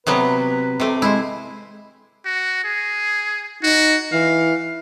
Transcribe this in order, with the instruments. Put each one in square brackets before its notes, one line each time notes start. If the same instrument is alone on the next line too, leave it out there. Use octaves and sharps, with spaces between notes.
[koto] C3 F#3 B3 [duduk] B4
[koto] C3 A3
[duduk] G#3 [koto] E4 C5
[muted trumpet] F#4
G#4
[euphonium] D#4 [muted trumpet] F#4
[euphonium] E3 [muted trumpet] F5